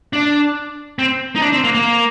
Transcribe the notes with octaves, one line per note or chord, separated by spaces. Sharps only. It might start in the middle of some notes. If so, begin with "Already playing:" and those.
D4
C4
D#4
D4
C4
A#3
A#3